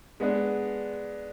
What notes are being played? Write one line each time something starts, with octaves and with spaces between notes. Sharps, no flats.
G#3 B3 D4